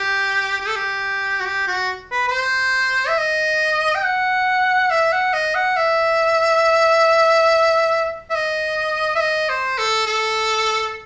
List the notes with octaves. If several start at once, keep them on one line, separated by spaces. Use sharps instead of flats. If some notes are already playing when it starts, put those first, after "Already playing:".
Already playing: G4
G4
A4
G4
F#4
G4
F#4
B4
B4
C5
E5
D#5
G5
F#5
E5
F#5
D#5
F#5
E5
E5
D#5
E5
D#5
C5
A4
A4